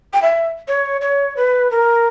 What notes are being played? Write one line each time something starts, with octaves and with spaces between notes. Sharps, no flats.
G5
E5
C#5
C#5
B4
A#4